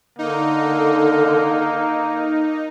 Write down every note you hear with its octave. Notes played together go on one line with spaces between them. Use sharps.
D3 A#3 D#4